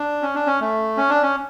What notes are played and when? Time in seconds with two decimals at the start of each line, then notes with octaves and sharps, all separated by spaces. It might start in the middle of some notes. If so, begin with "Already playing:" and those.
Already playing: D4
0.22 C#4
0.35 D4
0.47 C#4
0.60 A3
0.97 C#4
1.09 D4
1.23 C#4